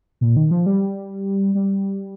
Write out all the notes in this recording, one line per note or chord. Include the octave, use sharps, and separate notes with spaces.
A#2
D#3
F3
G3
G3